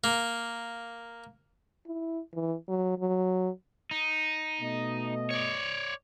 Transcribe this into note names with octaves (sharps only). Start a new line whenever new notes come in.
A#3
E4
E3
F#3
F#3
D#4
B2 A3 D#5
C#5 D5